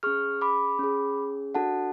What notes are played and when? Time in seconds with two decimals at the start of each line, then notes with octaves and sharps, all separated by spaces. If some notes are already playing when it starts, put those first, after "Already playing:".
0.03 C#4 G#4 C#6 F6
0.41 B5 D6
0.79 C#4 G#4
1.55 D4 F#4 A4 F#5 A5